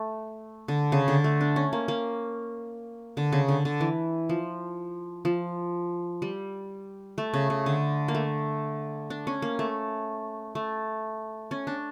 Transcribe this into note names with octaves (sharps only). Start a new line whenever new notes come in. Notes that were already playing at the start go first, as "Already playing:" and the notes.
Already playing: A3
D3
C#3
D3
A3
D4
C#4
A#3
A#3
D3
C#3
D3
D3
E3
F3
F3
G3
A3
C#3
C#3
D3
A#3
A3
D4
C#4
A#3
A3
A3
C#4
D4